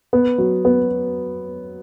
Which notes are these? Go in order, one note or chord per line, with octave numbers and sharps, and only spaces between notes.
B3
F#3
B3